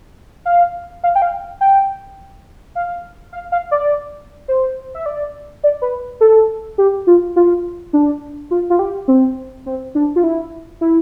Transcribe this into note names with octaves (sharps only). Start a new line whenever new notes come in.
F5
F5
G5
F5
G5
F5
F5
F5
D5
C5
E5
D5
D5
B4
A4
G4
F4
F4
D4
F4
F4
G4
C4
C4
D4
F4
E4
E4